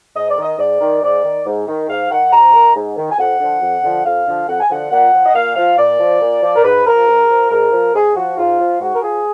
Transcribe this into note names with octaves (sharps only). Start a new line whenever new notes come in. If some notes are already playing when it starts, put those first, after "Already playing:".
G#2 D#5
D5
D#3
D#5
G#2 D5
D#3
G#2 D5
D#3
G#2
D#3
G#2 F5
D#3 F#5
G#2 A#5
D#3
G#2
D#3
G#5
F2 F#5
D3 F3
F2
D3 F3
F2 F5
D3 F3
F2 F#5
G#5
D3 F3 F#5
A#2 F#5
F3
D#5
A#2 F5
F3 F5
A#2 D5
F3
A#2
F3
A#4
G#2 B4
F3 A#4
G#2
F3
G#2 A#4
F3
G#2 G#4
F3 F#4
G#2 F4
F3
G#2 F#4
A#4
F3 G#4